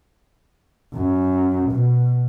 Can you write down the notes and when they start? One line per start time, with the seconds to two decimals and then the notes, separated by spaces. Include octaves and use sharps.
0.94 F#2
1.71 B2